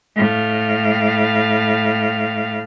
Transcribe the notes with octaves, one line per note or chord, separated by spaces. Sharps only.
A2 F5